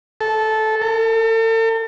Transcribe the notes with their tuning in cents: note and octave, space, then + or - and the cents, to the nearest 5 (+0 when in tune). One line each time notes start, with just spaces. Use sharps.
A4 -15
A4 +40